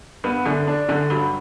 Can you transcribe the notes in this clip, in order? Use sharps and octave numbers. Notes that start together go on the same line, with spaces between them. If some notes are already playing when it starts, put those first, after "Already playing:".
G2 B3
F#2 D3
D4
F#2 D3
G2 F#3